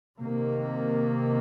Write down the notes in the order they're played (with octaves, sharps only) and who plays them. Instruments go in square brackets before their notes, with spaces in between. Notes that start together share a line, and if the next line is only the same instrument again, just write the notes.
[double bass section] C3 D#3 A#3